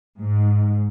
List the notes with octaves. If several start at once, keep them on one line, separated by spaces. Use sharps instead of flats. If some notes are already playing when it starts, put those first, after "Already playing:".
G#2